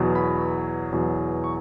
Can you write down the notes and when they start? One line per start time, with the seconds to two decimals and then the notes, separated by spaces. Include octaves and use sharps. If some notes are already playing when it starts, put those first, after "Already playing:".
Already playing: E2 B2 F#3
0.15 B5
0.92 E2 B2 F#3
1.44 C#6